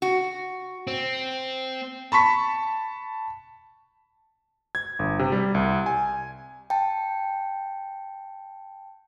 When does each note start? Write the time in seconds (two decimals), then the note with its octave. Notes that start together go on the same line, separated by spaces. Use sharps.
0.02 F#4
0.87 C4
2.12 A5 B5 C#6 B6
4.75 G#6
4.99 G1
5.19 C3
5.32 G3
5.55 C2
5.86 G#5
6.70 G5 A5